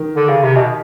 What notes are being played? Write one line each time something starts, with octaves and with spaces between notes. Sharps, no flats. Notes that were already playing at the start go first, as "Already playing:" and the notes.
Already playing: D#3
D3
C#3
C3
B2